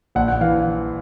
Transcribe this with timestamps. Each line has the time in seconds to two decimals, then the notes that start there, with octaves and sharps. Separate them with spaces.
0.15 A#1 F#5
0.28 F#5
0.41 E3 F5